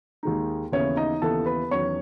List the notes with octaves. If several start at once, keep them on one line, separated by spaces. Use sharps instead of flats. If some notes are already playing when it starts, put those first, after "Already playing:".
D#2 D#3 G#3 D#4
D#2 C#3 E3 B3 E4 C#5
D#4 D#5
D#2 C#3 E3 B3 E4 A4 A5
B4 B5
E2 D#3 F#3 C#4 C#5 C#6